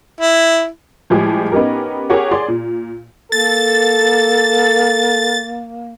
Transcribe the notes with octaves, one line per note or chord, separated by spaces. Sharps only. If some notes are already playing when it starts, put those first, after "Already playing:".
E4
A2 F3 G3 G#3 G4 G#4
B3 C#4 D#4 G4 A#4
G4 G#4 A#4 C#5 F#5
G#4 D5 C6
A#2
A#3 A4 A6